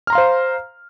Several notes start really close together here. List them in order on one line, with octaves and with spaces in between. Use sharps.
F6 A#5 C6 F5 C5